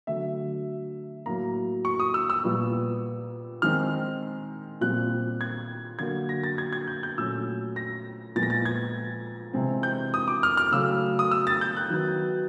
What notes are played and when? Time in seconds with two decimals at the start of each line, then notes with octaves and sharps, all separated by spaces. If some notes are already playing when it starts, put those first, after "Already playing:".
0.07 D3 F#3 A3 E5
1.26 A2 F#3 A#3 A#5
1.85 C#6
2.00 D#6
2.14 E6
2.30 E6
2.44 A#2 G3 B3
3.62 D#3 G#3 C4 F6
4.81 A#2 G3 C4 F#6
5.41 G#6
5.99 D3 F#3 A#3 G#6
6.29 A#6
6.43 A6
6.58 G#6
6.73 G#6
6.88 G6
7.03 G6
7.18 A#2 F#3 A3 C#4 E6
7.76 A#6
8.35 A#2 F3 G#3 B3 A6
8.43 A#6
8.50 A6
8.65 G#6
9.53 C3 E3 G#3 C4
9.83 G6
10.14 D#6
10.28 D6
10.43 F6
10.57 F6
10.72 C#3 F#3 A3 E6
11.19 D#6
11.31 E6
11.47 A6
11.61 G6
11.76 F#6
11.90 D#3 F#3 B3